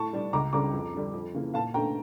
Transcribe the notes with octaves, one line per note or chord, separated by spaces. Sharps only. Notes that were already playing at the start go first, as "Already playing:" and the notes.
Already playing: A2 A5 C#6
G3 D4
C#2 A#5 D6
C#3 G3 D4 A#5 D6
F2
D3 G3
F2
C#3 E3 A#3
A#2 F5 A5
A3 C#4 G5 A#5